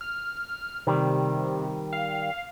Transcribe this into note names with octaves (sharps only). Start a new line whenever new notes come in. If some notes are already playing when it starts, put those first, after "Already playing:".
F6
C3 D#3 G3
F5